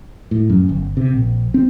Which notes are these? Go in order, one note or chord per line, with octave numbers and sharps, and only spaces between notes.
A2
F#2
G1
C3
A#1
C4